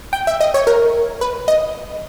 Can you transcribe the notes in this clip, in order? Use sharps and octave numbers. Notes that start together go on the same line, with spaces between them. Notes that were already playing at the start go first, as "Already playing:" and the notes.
G5
E5
D#5
C#5
A#4
B4
D#5